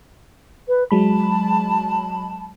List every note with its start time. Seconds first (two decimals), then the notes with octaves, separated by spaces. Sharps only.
0.68 B4
0.91 F#3 G#3 A5 B5